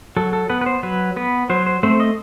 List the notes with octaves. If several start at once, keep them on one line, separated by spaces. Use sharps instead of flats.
F#3 A4
A4
B3 B4
B4
C5
F#3 B4
B3 B4
F#3 C5
C5
A3 C4 C5
D#5